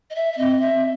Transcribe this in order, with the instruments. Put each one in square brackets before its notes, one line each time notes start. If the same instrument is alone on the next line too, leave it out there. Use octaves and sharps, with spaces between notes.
[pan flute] D#5
E5
E5
[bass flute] C4 [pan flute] D#5
[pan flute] E5